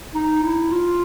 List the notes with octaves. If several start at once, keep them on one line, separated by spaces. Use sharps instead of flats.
D#4
E4
F4